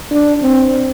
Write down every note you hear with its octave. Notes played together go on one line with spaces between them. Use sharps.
D4
C4